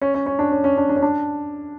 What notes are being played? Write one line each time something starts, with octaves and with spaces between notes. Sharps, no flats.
C#4
C#4
C#4
D4
C#4
C#4
D4
D4
C#4
D4